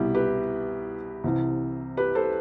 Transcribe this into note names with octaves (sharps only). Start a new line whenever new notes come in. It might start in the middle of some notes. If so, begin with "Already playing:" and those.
Already playing: C2 B2 G3 E4 G4
G4 B4
C2 C3 E3
G4 B4
A4 C5